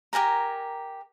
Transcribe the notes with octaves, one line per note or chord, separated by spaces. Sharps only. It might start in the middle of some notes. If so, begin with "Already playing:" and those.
G4 A#4 G#5 A#5